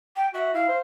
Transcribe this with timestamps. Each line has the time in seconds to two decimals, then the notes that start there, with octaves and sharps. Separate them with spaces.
0.16 G5
0.34 F#4 E5
0.54 E4 F5
0.68 C5